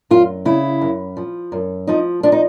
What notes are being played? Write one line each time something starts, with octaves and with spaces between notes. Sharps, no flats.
F#2 F4
C#3 E4
F#2
F3
F#2
F3 D#4
F3 D4
D#4